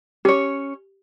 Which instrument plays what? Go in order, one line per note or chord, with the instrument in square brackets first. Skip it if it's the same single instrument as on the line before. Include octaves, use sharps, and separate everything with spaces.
[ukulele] C#4 C#5 [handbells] G4